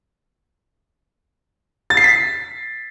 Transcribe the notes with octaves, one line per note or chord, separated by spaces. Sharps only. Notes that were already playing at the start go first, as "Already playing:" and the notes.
A6
C7
B6